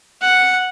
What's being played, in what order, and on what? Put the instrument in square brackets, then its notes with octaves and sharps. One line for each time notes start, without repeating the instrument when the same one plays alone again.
[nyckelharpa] F#5